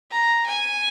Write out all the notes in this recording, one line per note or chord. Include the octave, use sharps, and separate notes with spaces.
A#5
G#5